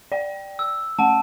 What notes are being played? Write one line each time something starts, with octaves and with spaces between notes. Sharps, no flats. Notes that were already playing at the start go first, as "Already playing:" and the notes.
D5 G5
E6
A3 F#5 A5